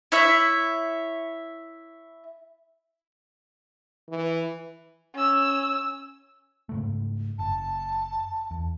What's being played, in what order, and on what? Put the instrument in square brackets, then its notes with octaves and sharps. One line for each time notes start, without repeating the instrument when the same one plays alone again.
[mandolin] E4 C#5 E5
[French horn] E3
[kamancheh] C#4 E6
[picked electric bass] G#2 C#3 A3
[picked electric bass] F#1 [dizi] A5
[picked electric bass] E2